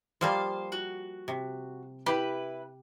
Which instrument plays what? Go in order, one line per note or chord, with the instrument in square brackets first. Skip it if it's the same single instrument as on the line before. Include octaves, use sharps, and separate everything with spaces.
[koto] F3 G3 A#3 [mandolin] C5 F5
[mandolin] F#4
[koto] C3
[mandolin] E4 B4 [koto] G4